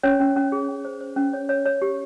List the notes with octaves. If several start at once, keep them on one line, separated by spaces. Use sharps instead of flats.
C#4 C#5
C#4
C#4
G#4
C#4
C5
C5
C#4
C#5
C#5
C#5
G4